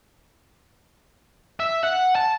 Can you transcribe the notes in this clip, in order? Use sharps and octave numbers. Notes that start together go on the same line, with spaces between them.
E5
F#5
A5